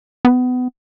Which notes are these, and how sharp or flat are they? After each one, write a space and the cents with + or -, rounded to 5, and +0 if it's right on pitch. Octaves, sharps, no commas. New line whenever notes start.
B3 +25